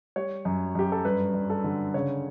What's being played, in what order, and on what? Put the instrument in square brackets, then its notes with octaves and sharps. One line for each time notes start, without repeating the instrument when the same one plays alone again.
[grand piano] G3 C#5
F#2
F#2 G4
A4
G2 B4
G2
A4
D3
C#3 C#5